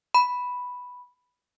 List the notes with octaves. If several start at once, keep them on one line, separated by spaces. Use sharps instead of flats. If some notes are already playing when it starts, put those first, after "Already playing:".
B5